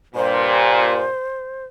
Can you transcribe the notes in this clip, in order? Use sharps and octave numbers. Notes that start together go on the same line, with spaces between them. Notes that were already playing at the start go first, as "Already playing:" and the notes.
G2 A#2 C5